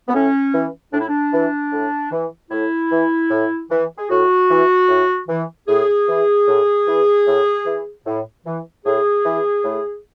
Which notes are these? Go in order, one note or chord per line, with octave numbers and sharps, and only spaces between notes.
B3
A2 C#4
E3
A2 D4
E4
D4
E3
A2
E3
A2 E4
E3
A2
E3
G#4
A2 F#4
E3
A2
E3
A2 G#4
E3
A2
E3
A2
E3
A2
E3
A2 G#4
E3
A2